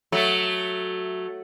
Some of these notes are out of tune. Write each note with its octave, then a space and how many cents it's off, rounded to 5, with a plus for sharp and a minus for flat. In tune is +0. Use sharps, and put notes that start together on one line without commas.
F#3 +0 A3 +0